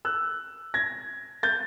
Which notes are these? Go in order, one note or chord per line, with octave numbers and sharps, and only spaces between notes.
E6 F#6
G#6 A#6
G6 A6